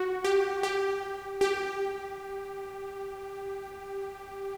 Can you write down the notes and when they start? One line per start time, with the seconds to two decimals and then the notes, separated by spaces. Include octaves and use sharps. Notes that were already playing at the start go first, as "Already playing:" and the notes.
Already playing: F#4
0.24 G4
0.63 G4
1.41 G4